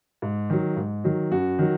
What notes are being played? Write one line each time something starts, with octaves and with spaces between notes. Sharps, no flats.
G#2
D#3 F#3
G#2
D#3 F#3
F#2 F#4
D#3 F#3